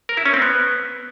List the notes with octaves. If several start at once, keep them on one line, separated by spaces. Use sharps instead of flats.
A#4
E4
C#4
C4
B3